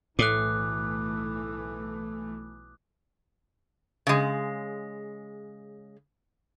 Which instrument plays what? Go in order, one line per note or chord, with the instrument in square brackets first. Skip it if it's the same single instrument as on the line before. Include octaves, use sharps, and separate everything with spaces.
[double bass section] B1 E3 A3 [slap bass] A2 [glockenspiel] D6 D#6 F#6
[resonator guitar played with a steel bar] C#3 G#3